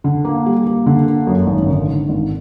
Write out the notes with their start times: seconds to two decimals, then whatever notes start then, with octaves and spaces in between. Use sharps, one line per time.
0.04 D3
0.25 A#3
0.46 G3
0.67 A#3
0.86 D3
1.07 A#3
1.27 F#2
1.47 G#1
1.68 D3
1.88 D3
2.09 G#1